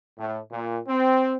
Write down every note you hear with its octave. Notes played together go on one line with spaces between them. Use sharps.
A2
A#2
C4